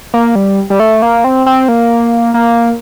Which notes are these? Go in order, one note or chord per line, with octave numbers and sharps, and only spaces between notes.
A#3
G3
G3
A3
A#3
C4
C4
A#3
A#3